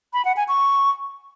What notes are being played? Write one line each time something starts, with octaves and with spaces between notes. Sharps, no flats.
B5
F#5
G#5
C#6